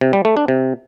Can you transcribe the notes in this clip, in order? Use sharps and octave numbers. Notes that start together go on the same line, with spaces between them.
C3
G3
A3
D4
C3